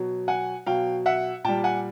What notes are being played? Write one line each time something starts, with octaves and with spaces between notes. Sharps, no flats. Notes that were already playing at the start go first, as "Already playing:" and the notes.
Already playing: B2 F#3
F#5 G#5
B2 F#3 F5 G5
E5 F#5
A#2 G3 G5 A5
F#5 G#5